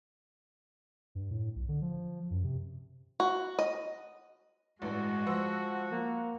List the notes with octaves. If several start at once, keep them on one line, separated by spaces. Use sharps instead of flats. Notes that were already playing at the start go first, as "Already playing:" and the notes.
G2
A2
B1
D3
F3
F#2
C3
F#4
D#5
A1 G2 G#3 F#4
F3 C5 F#5 E6
A#3